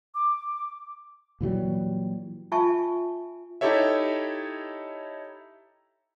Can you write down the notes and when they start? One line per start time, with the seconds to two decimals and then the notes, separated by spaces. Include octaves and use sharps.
0.15 D6
1.41 A#2 E3 F#3 G3
2.52 F4 E5 G#5 A5 C#6
3.61 D#4 E4 G4 A4 C#5 E5